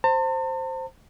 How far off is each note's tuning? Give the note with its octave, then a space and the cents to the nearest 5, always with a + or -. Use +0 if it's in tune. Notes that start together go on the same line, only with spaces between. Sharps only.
C5 +0 A5 +45